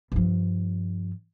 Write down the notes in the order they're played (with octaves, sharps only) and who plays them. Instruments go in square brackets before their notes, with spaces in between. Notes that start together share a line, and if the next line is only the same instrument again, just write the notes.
[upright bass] G2 F3